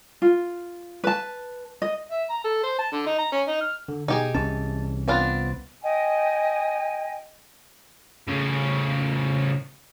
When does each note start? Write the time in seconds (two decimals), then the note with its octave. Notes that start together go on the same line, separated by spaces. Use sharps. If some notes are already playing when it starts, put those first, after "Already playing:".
0.22 F4
1.04 B4 A5
1.82 D#5
2.11 E5
2.30 A#5
2.44 A4
2.63 C5
2.79 A5
2.92 D3
3.06 D#4
3.19 A#5
3.32 C#4
3.48 D#4
3.61 F6
3.88 D3
4.08 B2 D#4 G4 G#4
4.35 C2 E3 C#4 A5
5.08 B3 C4 D4 F4 B4 A6
5.82 D#5 G5 G#5
8.27 A2 C#3